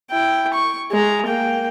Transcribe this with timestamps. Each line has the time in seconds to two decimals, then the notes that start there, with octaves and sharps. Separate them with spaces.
0.11 E4 G5
0.54 C#6
0.91 G#3 A#5
1.26 A#3 G5